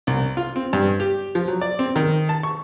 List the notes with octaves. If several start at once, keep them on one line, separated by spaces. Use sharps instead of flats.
C2
F4
C4
G2
G4
F3
F#3
D5
C4
D#3
A5
C#6